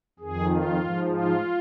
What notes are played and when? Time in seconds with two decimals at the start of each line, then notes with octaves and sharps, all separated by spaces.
0.19 F2 D#3 G#4
0.48 F4
0.78 G#2 F3
1.07 F4